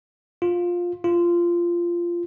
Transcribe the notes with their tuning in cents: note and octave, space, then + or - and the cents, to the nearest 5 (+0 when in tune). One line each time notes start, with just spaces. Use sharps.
F4 +10
F4 -15